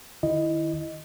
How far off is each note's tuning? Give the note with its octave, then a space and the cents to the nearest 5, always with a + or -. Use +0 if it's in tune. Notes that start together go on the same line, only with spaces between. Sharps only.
D#3 -25 E4 +0 D#5 +0